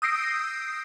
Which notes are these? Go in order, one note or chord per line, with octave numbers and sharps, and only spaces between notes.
D#6 E6 G6 A#6 C7 D7